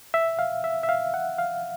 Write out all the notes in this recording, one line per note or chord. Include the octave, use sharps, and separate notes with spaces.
E5
F5
E5
E5
F5
F#5
F5